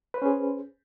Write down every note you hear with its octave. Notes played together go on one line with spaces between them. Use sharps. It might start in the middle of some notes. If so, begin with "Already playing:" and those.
C#4 G#4 B4 C5